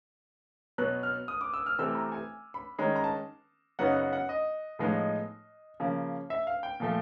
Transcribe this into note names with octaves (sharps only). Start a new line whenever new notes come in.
B2 F#3 B3 F#6
F6
D#6
D6
E6
F6
C3 E3 A3 C4 E6
A#5
G#5
B5
D#3 G#3 C#4 A#5
A#5
A5
F#2 C#3 F#3 B3 D#4 F#5
F#5
F#5
D#5
A2 F3 G#3 B3 D#4
C#3 F3 A#3
E5
F5
G5
A#2 F3 A3